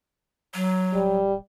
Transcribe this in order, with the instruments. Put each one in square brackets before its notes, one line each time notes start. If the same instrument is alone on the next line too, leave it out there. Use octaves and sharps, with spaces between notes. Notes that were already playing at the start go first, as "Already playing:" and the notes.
[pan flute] F#3
[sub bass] D1 [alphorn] G3